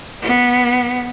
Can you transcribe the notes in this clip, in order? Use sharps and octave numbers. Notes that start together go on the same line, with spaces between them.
B3